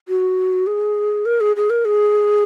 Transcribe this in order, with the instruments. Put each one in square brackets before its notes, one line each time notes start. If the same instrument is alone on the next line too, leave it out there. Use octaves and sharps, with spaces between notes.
[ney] F#4
G#4
A#4
G#4
G#4
A#4
G#4